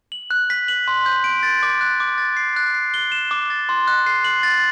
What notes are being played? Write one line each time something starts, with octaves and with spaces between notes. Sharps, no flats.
F#7
F#6
B6
F#7
C6
G6
D7
A6
D6
F#6
D6
A6
C7
F#6
C7
G7
E7
D6
A6
C6
F#6
C7
F#7
A6